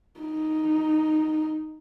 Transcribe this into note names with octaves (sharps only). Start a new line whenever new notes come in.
D#4